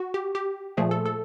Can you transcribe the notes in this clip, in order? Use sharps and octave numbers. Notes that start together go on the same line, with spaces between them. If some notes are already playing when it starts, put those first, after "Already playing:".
Already playing: F#4
G4
G4
A#2 F3 A3 G#4
A4
A4